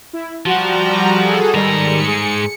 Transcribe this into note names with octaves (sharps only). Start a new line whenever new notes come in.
E4
F3 G3 F#4 F#5 A#5
G#4 A4
G#2 D#3 G3 A#5 C#7
G#4